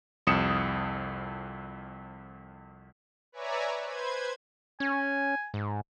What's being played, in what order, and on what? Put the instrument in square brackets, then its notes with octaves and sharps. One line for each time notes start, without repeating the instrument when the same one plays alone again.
[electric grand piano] C2 F2 D#6 C#7 E7
[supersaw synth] B4 C#5 D5 E5 G#5 A#5
B4 C5 G#6
[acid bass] C#4 [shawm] G#5
[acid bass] G#2